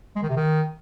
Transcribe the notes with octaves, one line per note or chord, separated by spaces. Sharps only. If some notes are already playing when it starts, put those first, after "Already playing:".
G#3
D#3
C3
D#3